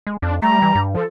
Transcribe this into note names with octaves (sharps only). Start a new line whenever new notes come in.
G#3
F2 D4
G3 A3 A#5
E3
G2
F3 A4